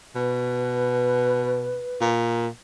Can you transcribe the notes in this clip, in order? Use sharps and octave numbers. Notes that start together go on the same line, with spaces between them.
B2 B4
A#2